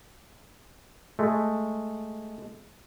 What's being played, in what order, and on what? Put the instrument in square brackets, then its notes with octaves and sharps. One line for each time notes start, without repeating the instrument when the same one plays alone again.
[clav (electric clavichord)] G#3 A3